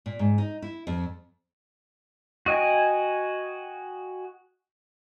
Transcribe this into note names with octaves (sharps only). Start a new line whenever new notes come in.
A#2
G#2
D#4
E4
F2
F#4 D#5 G5 G#5